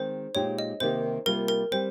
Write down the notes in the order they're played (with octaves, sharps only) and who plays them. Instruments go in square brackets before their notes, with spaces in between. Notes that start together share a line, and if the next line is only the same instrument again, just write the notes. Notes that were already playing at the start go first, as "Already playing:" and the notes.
Already playing: [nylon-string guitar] D#3 G#3 C4 [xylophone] C5
[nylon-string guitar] A#2 G#3 D#4 G4 [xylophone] C#5
[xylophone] D#5
[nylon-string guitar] C3 D#3 A#3 D#4 G4 [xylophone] C5
[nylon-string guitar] C3 G3 A#3 F4 [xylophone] A#4
[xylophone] A#4
[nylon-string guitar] G3 C4 [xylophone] C5